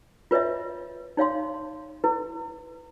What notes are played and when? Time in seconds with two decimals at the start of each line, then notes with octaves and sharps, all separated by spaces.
0.31 F4 B4 C#5 D#5 E5
1.17 D#4 C#5 F5 C6
2.04 E4 B4